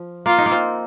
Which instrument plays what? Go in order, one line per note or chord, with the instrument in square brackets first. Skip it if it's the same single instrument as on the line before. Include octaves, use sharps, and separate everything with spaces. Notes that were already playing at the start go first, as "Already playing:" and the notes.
Already playing: [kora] F3
[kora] A#3 [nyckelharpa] F4
[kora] D#4
A#3
C4